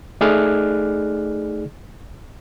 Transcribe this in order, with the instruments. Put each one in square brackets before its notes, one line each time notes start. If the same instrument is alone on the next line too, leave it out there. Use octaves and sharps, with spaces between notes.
[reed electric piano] A3 D#4 G#4 D5 F6 F#6